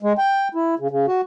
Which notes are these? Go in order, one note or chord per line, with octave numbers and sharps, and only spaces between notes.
G#3
G5
E4
C#3
C#3
F#4